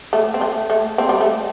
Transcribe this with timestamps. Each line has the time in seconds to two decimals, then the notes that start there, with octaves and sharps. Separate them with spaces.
0.13 A3
0.34 C4
0.41 A3
0.70 A3
0.98 C4
1.09 G3
1.21 A3